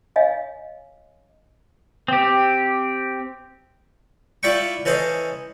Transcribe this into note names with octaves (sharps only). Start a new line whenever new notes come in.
C#5 D#5 F5 G#5
C4 G4
E4 F4 D5 E5 G5 C#6
E3 C#4 A4 C5 D#5